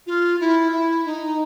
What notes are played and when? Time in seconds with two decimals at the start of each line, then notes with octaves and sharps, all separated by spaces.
0.06 F4
0.40 E4
0.71 E4
1.05 D#4